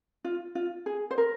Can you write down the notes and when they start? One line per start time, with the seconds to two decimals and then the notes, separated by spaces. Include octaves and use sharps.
0.25 F4
0.55 F4
0.86 G#4
1.11 C5
1.18 A#4